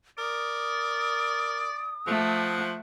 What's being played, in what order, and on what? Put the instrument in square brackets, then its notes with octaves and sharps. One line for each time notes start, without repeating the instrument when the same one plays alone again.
[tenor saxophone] A#4 [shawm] D5 [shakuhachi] D#6
[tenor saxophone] F3 [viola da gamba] A3 [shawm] F#5